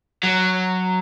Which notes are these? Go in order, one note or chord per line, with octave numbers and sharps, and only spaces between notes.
F#3